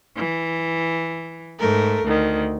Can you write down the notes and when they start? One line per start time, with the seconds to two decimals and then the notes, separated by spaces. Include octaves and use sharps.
0.15 E3
1.59 G#2 A3 A#4
2.04 D2 D#3